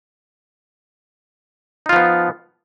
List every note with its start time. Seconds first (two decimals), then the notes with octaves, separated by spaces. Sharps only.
1.86 D#4
1.89 F4
1.93 F3
1.96 B3